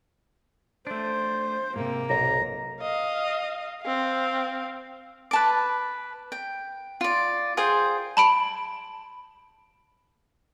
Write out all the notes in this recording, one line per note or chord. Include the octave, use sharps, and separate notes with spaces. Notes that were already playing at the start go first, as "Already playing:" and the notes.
A3 D4 C5
G#2 C3 A#3
B1 C5 C#5 A#5
D#5 F5
C4 F5
B4 A5 D6
G5
F4 D5
F4 G#4 C5 G5
A5 B5 D7